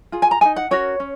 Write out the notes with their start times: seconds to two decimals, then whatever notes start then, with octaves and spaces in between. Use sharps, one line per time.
0.12 F4 G#4
0.22 G#5
0.31 A#5
0.41 G#4 G#5
0.45 D#4
0.56 F#5
0.71 C#4 F#4 A#4 C#5
1.00 C#4